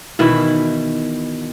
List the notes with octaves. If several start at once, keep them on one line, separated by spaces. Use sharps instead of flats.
B2 D#3 E3 E4